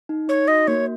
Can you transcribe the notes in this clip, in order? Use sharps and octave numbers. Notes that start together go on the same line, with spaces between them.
D#4
D#4 C#5
F#4 D#5
A#3 C#5